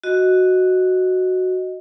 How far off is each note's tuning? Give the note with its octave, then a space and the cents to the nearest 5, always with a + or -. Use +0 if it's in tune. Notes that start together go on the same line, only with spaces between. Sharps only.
F#4 +0 D#5 +0